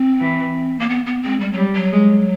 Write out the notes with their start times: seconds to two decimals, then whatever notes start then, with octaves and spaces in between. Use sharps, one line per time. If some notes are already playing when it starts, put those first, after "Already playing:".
Already playing: C4
0.20 E3
0.80 A#3
0.89 B3
1.06 B3
1.23 G#3 C4
1.40 G3
1.53 F#3 G3
1.75 F#3
1.91 G#3